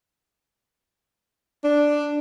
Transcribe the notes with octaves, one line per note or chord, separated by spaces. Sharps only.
D4